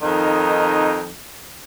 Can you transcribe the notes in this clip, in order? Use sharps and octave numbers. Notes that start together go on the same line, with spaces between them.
F2 D#3 D#4